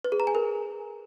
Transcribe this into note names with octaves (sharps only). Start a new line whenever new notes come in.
B4
G#4
A#5
G#5
A#4